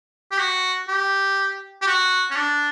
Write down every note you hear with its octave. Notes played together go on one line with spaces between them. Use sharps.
G4
F#4
G4
G4
F#4
C#4
D4